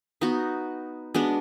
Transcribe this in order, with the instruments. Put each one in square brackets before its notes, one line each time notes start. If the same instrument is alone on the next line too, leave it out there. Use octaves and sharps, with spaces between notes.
[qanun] B3 D#4 F#4
G#3 B3 D4 F#4